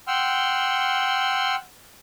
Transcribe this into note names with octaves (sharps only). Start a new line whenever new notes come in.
F#5 G5 C6 E6 F6